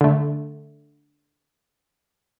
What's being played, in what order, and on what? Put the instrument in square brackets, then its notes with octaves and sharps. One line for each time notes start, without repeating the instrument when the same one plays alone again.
[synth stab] D3 A3